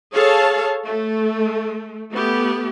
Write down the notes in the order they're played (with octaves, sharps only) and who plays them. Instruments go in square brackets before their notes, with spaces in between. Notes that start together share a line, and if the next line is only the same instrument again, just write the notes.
[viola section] G#4 A4 C#5 F5 A5
A3
A3 B3 G4